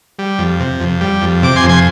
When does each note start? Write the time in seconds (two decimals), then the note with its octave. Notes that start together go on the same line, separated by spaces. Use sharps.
0.19 G3
0.38 F2
0.60 C3
0.80 F2
1.01 G3
1.22 F2
1.43 C3 D6
1.56 G#5 C6
1.63 F2
1.69 G#5 C6